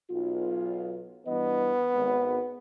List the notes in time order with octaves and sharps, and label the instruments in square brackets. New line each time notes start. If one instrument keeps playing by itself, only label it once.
[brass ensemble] B1 F4
[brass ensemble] G2 E3 D#5 [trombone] B3
[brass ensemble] G#1